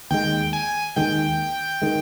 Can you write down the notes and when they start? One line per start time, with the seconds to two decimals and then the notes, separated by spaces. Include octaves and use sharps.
0.11 D#2 D#3 G#3 G5
0.53 G#5
0.96 D#2 D#3 G#3 G5
1.82 D#3 G#3